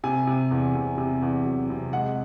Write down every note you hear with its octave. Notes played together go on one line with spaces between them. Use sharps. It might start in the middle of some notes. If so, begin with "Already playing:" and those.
C3 G#5
C3
E2
C3
C3
E2
F#3
C3
G#3 F#5